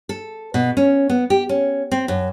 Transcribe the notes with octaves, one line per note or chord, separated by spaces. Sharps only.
A4
B2
C#4
B3
G4
C#4
C4
F#2